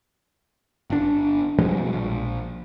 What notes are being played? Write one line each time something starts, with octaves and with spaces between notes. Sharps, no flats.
G1 D4
B2 F3 G3 G#3
A#1